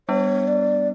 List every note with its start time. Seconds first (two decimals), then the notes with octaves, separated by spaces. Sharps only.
0.09 G3 B3 D4 C#5
0.48 D5